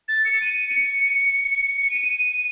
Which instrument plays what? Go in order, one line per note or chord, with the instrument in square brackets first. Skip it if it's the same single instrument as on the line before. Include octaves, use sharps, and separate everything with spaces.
[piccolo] A6
C#7
D#7
C#7
C#7
D#7